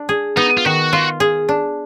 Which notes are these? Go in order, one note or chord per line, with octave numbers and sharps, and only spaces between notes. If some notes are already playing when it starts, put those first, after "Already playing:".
Already playing: D4
G#4
B3 D#4
F4
D#3 F#4
F4
G#4
D4